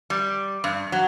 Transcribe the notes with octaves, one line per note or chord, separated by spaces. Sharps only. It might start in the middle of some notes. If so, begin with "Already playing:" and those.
G3
G2
F#3